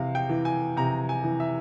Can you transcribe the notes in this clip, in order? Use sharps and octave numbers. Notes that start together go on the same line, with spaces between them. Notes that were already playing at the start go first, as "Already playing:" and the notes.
Already playing: C3 E3 F5
G5
E3
G#5
C3 A#5
G#5
E3
E5